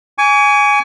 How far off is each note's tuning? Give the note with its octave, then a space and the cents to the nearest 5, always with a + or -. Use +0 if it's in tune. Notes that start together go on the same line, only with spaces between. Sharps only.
G#5 +0 C#6 +45